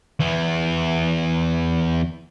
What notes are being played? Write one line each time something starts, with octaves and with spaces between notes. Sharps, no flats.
E2 E3